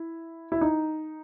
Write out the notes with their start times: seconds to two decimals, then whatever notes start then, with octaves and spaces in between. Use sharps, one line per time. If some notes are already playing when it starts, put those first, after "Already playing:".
Already playing: E4
0.52 E4
0.61 D#4